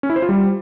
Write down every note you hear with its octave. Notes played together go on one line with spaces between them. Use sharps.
C#4
E4
C5
F4
G3